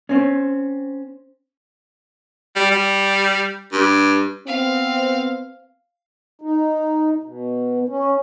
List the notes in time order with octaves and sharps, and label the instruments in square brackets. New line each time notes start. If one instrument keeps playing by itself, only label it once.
[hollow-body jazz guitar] C4 C#4
[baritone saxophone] G3
G3
G2
[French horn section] B3 C4 [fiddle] F5
[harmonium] D#4
B2
C#4